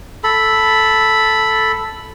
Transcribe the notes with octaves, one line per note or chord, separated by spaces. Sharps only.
A4 B5